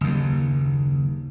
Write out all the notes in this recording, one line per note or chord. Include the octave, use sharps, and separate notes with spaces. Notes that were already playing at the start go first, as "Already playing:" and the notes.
F#1 D#2